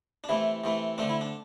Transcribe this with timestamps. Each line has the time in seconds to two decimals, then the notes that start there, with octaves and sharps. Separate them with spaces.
0.24 D4
0.29 C3 E3 A3 E4
0.64 C3 E3 A3
0.98 D3 A3 C4 D4
1.09 E4
1.21 D4